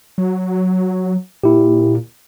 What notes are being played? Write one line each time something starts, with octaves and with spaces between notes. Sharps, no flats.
F#3
A#2 E4 G4